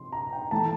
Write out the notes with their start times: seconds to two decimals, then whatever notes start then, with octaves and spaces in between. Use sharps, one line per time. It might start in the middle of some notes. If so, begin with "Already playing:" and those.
Already playing: C3 F3 C6
0.12 A#5
0.33 G5
0.51 E3 A3 A5